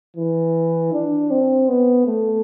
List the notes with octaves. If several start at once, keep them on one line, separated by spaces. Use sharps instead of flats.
E3
D4
C4
B3
A3